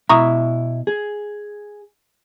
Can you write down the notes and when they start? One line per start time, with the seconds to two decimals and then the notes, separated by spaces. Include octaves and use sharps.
0.10 B2 E4 E5 A#5 C#6 D#6
0.87 G#4